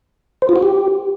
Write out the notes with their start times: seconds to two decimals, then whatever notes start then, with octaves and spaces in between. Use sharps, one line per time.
0.42 C5
0.49 F4
0.56 F#4
0.62 G4